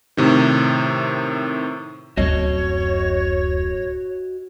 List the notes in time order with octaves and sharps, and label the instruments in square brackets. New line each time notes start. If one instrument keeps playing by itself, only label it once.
[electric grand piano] A2 C3 D#3
[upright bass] D1 F#2 [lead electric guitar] F#4 D#5 [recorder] C#5